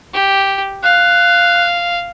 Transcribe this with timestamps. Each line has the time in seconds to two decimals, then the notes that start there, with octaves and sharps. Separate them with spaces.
0.14 G4
0.83 F5 F#6